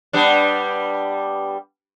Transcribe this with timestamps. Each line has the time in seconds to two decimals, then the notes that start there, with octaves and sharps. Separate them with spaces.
0.13 G3 B3 D4